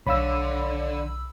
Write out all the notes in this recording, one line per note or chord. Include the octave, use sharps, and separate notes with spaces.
B1 D3 C#5 F5 B5 E6